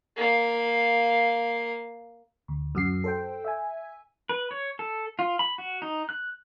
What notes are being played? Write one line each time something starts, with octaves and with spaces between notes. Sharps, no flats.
A#3 F5
D2
F#2 F#4 C7
A4 C5 G5
E5 G#5
B4
C#5
A4
F4
B5
F#4
D#4
F#6